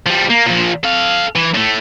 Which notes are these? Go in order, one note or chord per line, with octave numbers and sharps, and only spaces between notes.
F3 G3
A#3
A#2 F3
A4 F5
E3
A2 A3